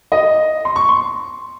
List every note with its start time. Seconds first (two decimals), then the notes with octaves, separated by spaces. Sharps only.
0.12 D#5
0.65 C6
0.76 C#6
0.89 C6